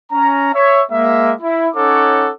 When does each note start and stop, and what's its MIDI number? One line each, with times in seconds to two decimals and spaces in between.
0.11 0.50 61
0.11 0.50 82
0.53 0.81 73
0.53 0.81 76
0.91 1.33 56
0.91 1.33 58
0.91 1.33 76
1.41 1.67 64
1.74 2.29 61
1.74 2.29 63
1.74 2.29 69
1.74 2.29 73
1.74 2.29 78
1.74 2.29 86